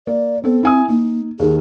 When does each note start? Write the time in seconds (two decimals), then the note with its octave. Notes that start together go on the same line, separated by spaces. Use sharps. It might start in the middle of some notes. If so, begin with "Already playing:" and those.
0.07 A#3 D5
0.44 B3 C4 A4
0.63 C4 E4 G#5 D#6
0.89 A#3 D#4
1.40 D#2 D#3 G#4